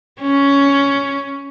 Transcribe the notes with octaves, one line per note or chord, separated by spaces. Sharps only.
C#4